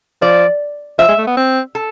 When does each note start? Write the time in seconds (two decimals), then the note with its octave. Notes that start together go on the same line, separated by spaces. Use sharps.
0.22 F3 D5
0.99 F3 E5
1.09 G#3
1.18 A3
1.27 B3
1.37 C4
1.75 A4